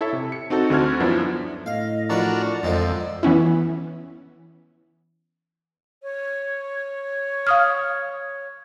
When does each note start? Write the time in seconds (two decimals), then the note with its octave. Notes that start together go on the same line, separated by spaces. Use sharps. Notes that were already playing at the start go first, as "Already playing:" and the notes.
0.01 E4 A4 C#5 E5
0.13 C3
0.32 C#7
0.50 C4 D#4 F#4 A4
0.70 D2 D3 C4 F#4 F6 G#6
1.00 F#2 F3 B3 D4 E4
1.66 A2 D#5 F5
2.10 F3 D4 F#4 A#4 B4 D5
2.63 F2 D3 F3 G#3
3.23 E3 B3 C#4 E4
6.03 C#5
7.47 F5 D#6 F6